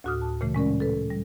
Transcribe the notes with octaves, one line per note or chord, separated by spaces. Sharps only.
D2 A2 F#4 D6 D#6 F6
A5
A#2 C#3 E3 A3
G#3 C#4 A#4 D5
A4 B4
G3